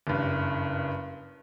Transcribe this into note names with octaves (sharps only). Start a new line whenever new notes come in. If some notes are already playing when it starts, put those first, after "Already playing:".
F#1 G2